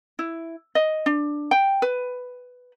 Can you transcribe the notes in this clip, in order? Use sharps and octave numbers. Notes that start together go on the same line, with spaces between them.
E4
D#5
D4
G5
B4